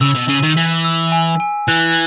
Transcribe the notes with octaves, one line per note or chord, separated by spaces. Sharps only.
C#3 E6
B2
C#3 D#7
D#3
E3 B6
E6
G#5
G#5
E3 F#6